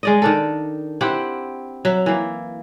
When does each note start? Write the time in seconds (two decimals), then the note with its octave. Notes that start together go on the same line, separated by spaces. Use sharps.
0.03 G#3 D5 D#5
0.22 D#3 D4 A4
1.01 C4 E4 G4 F#5
1.85 F#3 E5
2.06 E3 A#3